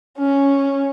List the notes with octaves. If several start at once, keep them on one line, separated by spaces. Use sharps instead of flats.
C#4